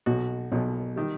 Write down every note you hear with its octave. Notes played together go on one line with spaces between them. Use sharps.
B1 B2 F#3 F#4
B1 B2 F#3
D#3 G3